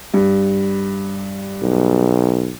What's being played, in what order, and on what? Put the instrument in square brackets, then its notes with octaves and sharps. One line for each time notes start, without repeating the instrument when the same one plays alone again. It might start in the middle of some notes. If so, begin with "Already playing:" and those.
[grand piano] G2
[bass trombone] B1